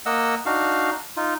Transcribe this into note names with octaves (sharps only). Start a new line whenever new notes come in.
A#3 D#5 F#5 E6
D4 D#4 F#4 F5
D#4 F4